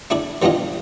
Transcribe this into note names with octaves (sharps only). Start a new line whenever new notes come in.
D4 E4 G#4 D5
E3 G3 B3 D4 F4 D#5